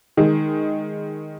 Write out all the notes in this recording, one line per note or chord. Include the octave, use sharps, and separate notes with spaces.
D#3 G#3